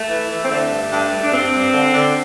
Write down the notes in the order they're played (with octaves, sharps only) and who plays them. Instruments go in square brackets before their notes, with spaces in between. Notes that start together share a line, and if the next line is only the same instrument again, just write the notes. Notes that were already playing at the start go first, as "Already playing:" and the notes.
Already playing: [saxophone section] A3
E3
E3
C4
D3 A3
G2
G2
G2
D4
G2 C4
G2
D3
D3